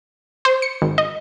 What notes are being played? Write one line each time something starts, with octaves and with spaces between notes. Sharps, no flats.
C5
C#7
G#1
D#5